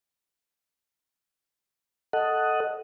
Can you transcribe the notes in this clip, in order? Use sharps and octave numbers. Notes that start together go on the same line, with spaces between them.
A4 D#5 F#5